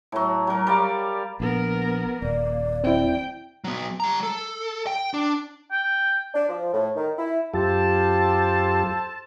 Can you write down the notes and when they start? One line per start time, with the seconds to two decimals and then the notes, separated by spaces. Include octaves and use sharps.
0.12 A2 F#3
0.47 F#3 A#4
0.67 G3 D5 F5
1.40 A#1 B3 A#4
2.22 D#1 A#3 D5
2.84 C4 E4 G5
3.64 F#3 B3
4.00 G3 A#5
4.23 A4
4.87 G5
5.14 D4
5.72 G5
6.35 D4
6.49 F3
6.74 A2
6.96 D#3
7.18 E4
7.54 F#2 F4 G4 A4 C5 A5